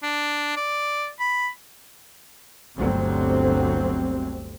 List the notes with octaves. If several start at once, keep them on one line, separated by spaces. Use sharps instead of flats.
D4
D5
B5
G1 D2 C3 F#3 C4